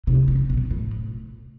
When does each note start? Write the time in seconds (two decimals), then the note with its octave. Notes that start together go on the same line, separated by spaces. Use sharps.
0.07 C3
0.28 C#3
0.50 B2
0.71 A2